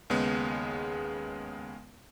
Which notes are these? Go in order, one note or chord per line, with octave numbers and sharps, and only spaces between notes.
D#2 C#3 G#3 B3